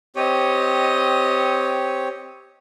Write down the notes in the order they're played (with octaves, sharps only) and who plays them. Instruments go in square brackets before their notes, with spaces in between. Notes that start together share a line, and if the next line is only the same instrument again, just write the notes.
[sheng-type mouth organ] C4 G4 C#5 [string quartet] D#5